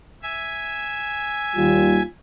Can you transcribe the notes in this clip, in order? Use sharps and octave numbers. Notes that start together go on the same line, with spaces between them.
E5 G#5
D#2 G3 F4